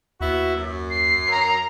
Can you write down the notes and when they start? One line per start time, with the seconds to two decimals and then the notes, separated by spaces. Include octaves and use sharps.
0.21 D#2 B3 E4 F#4
0.56 F#2
0.90 C7
1.28 A#4 A#5